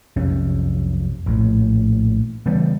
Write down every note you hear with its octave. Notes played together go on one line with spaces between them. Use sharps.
B1 F2 C3 C#4
A#1 A2
C#3 E3 G3 B3